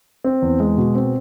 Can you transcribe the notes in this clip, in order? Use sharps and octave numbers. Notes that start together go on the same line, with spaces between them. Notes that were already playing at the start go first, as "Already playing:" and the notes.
C4
E2
G#3
B2
C4